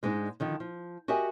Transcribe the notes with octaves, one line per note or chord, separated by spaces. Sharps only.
G#2 G#3 B3 D4 D#4
D3 D#3 F3
F3
F#4 G4 A#4 D#5 E5 G#5